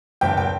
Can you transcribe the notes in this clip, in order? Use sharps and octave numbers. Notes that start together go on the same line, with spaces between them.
F#1 G5
G5